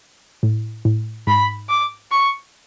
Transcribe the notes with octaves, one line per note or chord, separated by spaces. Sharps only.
A2
A2
G#2 B5
D6
C#6